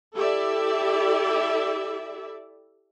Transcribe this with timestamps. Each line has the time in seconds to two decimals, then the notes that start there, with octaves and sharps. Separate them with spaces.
0.16 E4 G4 A4 D5 E5